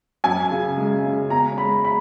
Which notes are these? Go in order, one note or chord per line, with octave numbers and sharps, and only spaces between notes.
F#2 G#5
C#3
G#3
C#3
E2 A#5
G#3 B5
B5